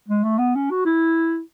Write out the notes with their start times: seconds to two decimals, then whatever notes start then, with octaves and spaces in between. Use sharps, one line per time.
0.08 G#3
0.23 A3
0.39 B3
0.55 C#4
0.70 F#4
0.85 E4